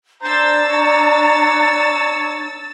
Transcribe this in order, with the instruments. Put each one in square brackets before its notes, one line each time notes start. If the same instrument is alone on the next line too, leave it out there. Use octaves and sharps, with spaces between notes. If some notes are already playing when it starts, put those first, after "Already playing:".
[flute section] D4 [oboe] C5 [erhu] A#5 [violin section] E6 A6
[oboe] C#5